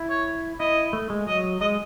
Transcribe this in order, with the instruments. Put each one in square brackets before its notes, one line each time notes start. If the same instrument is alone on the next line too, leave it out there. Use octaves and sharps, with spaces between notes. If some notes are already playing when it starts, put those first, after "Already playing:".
Already playing: [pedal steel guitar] E4
[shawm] C#5
[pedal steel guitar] E4 [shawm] D#5
[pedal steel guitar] A3
G#3
[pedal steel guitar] F#3 [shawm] D#5
[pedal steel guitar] G#3 [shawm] D#5